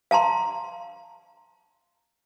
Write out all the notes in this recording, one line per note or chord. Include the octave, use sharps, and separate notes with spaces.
F5 A5 A#5 C6